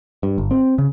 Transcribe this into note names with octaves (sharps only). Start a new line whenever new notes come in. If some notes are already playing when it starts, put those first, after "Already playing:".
G2
G1
C4
C#3